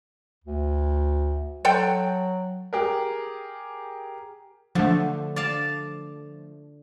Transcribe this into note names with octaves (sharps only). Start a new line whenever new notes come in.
D2
F#3 A4 F#5 G5
G4 G#4 A#4
D3 F3 A3
D5 F5 A5